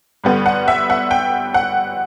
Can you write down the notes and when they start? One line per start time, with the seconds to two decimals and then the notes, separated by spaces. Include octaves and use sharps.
0.24 G2 D3 G3 B3
0.46 F#5
0.68 E5
0.90 F#5
1.11 G5
1.54 F#5